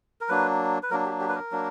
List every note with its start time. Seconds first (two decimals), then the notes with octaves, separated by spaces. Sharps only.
0.21 A#4
0.29 F#3 A#3 D4 B4
0.83 B4
0.90 F#3 A#3 D4 A#4
1.06 G4
1.21 G4
1.29 B4
1.36 A#4
1.51 F#3 A#3 D4